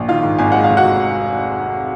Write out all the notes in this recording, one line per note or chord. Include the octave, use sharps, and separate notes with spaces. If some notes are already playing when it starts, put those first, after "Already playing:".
Already playing: A#1
D#3 F4 F5
G#2
G#1 G#5
G#3 F#5
F5
F1
F#4 F#5
F1